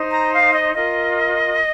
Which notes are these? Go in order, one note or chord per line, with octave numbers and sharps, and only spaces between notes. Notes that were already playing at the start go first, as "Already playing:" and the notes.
Already playing: D#4 C5
A#5
F5
D#5
F4 A#4 D#5